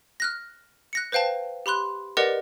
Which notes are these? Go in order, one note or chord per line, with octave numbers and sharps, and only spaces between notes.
F6 F#6 A#6
F#6 A#6 C#7
B4 C5 F5 G5 A5
G4 B5 C6 F#6
G4 A#4 B4 D5 D#5 F#5